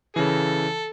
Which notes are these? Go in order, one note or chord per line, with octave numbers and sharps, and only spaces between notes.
C#3 E3 A4